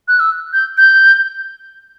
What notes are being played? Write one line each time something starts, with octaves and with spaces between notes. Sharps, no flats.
F#6
E6
G6
G6